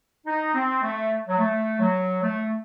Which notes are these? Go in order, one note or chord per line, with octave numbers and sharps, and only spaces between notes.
D#4
C4
A3
F#3
A3
F#3
A3